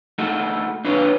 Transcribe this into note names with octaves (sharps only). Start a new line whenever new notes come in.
A3 D#4 F#4 A4
D4 F4 B4 C#5